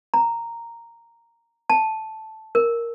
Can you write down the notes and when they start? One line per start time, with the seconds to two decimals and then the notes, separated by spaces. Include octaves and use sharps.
0.14 A#5
1.70 A5
2.55 A#4